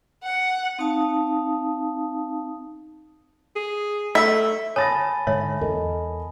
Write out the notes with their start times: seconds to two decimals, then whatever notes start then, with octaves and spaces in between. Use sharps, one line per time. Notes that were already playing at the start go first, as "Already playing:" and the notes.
0.24 F#5
0.79 C4 D#4 F5 A5 D#6
3.56 G#4
4.15 A3 E5
4.76 C#5 G#5 A5 B5 D#6 A6 A#6
5.27 G#2 D3 G#3 C#5 E5
5.61 E2 A4 A#4 D#5